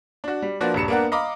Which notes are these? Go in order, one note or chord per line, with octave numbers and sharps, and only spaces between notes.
D4 F#4
G3
F3 A#3 D4 F#4 B4
D#1 G2 C#7 E7
A#3 B3 D4 A#4 F#5
D#5 F5 A#5 B5 D6